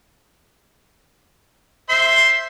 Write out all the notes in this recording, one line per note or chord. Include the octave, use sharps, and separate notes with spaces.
C5 E5 C6